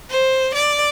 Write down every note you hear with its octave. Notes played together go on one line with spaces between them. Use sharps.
C5
D5